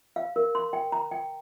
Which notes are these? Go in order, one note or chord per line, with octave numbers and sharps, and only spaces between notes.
F5
A#4
C6
G5
A#5
G5